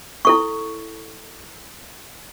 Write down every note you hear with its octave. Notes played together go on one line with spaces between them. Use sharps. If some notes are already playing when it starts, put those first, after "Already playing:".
E4 A4 C#6